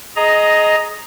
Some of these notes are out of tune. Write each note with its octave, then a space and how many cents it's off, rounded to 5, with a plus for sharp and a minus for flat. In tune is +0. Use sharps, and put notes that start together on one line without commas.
G#4 +20 D#5 +0 A#5 +0